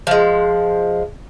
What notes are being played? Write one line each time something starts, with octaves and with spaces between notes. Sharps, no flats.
F3 G#3